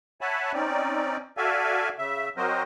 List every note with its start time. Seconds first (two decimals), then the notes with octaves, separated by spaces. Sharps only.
0.21 C#5 E5 F#5 G#5 A5 B5
0.54 C4 C#4 D#4 D5
1.37 F#4 A4 D5 E5 F5 G#5
1.98 C#3 E5
2.37 F#3 C4 F#4 A#4 C5 D#5